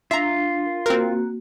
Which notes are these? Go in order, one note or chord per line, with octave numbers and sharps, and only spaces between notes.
D4 F4 E5 A#5
A#4
A#3 C4 F#4 A#4